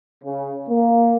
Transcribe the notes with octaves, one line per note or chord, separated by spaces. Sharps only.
C#3
A#3